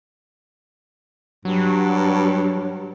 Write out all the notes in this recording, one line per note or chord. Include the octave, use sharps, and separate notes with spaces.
G2 F#3